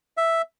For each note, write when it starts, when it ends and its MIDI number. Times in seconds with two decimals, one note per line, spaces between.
0.17 0.42 76